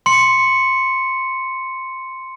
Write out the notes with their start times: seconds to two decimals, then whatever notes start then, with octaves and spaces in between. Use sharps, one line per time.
0.06 C6 C#7